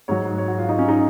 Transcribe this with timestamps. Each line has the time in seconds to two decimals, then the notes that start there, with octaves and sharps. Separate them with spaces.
0.08 G#2 F#3 C#5
0.38 C#5
0.48 F#4
0.59 F4
0.69 D#4
0.79 C#4
0.89 D#4